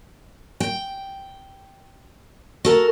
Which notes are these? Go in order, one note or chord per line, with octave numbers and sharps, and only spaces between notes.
G5
F#4 A4 A#4